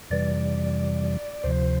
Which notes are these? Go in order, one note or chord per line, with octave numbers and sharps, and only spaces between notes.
F2 C3 E3 G3 D5
D2 C3 F3 C5